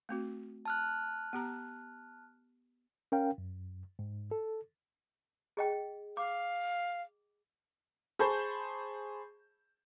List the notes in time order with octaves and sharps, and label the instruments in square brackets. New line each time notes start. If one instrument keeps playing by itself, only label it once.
[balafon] A3 C4 F#4
[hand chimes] A5 F6 F#6
[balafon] B3 G4 A#5
[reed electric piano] C#4 A#4 F5 G5
F#2
G#2
A4
[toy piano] G#4 D#5 G5
[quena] F5 [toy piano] D6
[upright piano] G#4 C5 A5 B5 C#6 G6